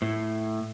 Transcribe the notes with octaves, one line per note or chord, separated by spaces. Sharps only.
A2